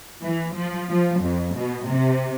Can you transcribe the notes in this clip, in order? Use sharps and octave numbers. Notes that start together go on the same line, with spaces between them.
E3
F3
F3
F2
B2
C3